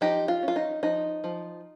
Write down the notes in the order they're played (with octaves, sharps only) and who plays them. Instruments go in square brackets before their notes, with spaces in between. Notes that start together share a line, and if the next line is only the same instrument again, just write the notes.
[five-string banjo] F3 D#4 G4
F4
C#4
F4
D#4
F3 D#4
F3